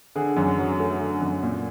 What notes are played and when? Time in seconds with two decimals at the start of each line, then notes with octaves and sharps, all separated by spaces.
0.16 D3 G#4
0.37 F#2
0.58 F#3
0.80 A3
1.01 D3
1.21 F#2
1.42 A#2